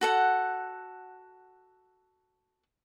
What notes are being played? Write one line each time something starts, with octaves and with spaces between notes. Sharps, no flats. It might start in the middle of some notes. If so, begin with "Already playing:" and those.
F#4 A4 F#5